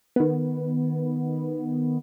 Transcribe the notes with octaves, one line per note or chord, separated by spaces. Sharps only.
D#3 B3